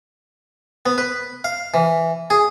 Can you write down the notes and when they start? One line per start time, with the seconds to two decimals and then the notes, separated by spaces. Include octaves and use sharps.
0.86 B3
0.98 B4
1.44 F5
1.74 E3
2.30 G#4